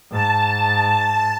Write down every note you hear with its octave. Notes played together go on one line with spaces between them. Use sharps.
G#2 A5